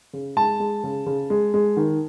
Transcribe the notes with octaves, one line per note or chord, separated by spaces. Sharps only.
C#3
G#3 A5
G#3
C#3
C#3
G#3
G#3
D#3